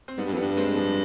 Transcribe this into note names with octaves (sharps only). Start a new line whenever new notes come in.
C4
G#2 G3 B3
G2
F2
G2 G3 B3
G#3 C4
F3 G#3